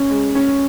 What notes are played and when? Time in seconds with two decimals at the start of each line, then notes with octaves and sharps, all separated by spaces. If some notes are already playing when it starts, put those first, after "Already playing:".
Already playing: C#4
0.10 G#3
0.35 C#4